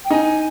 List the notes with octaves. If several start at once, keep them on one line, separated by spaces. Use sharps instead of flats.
G5
D#4 G#5